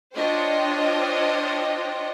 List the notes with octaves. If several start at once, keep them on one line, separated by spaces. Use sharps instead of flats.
D4 F4 C5 C#5 D#5 G5